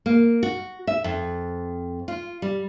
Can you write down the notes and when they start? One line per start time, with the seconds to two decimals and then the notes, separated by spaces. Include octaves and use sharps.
0.06 A#3
0.43 F#4
0.87 E5
1.04 F2
2.08 F4
2.42 G3